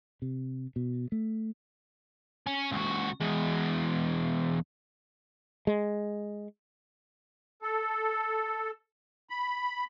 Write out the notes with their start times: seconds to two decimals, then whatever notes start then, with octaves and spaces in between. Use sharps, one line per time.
0.22 C3
0.76 B2
1.12 A3
2.47 C#4
2.72 C#2 F#4
3.21 E2 G#3
5.67 G#3
7.62 A4
9.30 B5